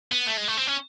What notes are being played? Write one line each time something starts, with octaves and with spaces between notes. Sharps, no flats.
B3
A3
G#3
A3
C4
C#4